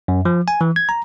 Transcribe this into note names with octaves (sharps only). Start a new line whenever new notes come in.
F#2
F3
G#5
E3
G#6
A#5